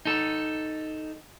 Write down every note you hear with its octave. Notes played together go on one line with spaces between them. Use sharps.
D#4 A4